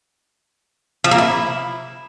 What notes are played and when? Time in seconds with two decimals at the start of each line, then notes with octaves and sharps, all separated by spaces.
1.04 F3
1.11 A#3
1.18 E4